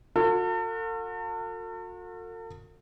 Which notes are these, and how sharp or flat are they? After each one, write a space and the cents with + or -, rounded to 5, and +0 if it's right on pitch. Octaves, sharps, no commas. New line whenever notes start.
F#4 -45 A4 +40